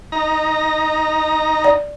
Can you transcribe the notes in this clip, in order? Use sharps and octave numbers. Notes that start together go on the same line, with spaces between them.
D#4 A#5
D5